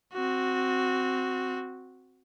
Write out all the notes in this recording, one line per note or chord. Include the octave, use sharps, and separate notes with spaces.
C4 F#4